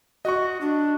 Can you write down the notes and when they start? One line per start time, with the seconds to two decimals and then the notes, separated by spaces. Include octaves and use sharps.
0.25 F#4 D#5 C#6
0.61 D4